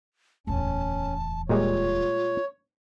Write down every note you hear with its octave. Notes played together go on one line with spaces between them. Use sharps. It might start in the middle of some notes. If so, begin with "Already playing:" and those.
D1 E2 C#4 A5
A#2 G3 G#3 F4 C#5